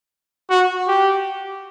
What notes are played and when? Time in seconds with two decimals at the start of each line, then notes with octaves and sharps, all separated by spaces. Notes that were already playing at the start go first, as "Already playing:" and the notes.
0.50 F#4
0.88 G4